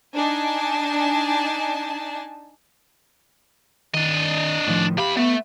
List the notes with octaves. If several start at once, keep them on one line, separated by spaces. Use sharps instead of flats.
D4 D#4 G#5 A5
D#3 D4 D#5
A2 D#3 F3
E2 G4 F5 B5
A3 B3